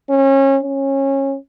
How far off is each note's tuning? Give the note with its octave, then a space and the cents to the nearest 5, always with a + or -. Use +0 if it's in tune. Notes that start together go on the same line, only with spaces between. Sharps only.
C#4 -30
C#4 -20